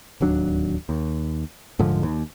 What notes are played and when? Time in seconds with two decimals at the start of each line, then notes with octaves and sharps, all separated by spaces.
0.21 D1 D#2 F#3 D4
0.89 D#2
1.79 D#1 G#2 D3 F3
2.03 D#2